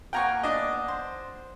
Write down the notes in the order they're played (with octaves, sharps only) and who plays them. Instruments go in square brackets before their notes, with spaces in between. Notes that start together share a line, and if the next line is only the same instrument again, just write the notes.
[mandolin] A#3 B3 G#5 [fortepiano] G5 A#5 C#6
[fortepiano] D4 D#5
[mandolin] C5